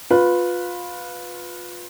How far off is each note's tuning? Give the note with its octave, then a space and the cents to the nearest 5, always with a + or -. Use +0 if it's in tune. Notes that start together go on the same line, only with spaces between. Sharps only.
F4 +20 B4 +0